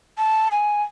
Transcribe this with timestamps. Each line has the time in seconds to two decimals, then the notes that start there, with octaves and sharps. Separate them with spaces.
0.18 A5
0.52 G#5